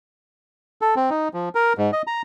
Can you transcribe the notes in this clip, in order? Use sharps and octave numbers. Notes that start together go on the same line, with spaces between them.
A4
C4
D#4
F3
A#4
G#2
D#5
A#5